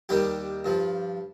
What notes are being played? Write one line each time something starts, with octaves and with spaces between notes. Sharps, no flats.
D#2 D#3 G3 G4
G2 F3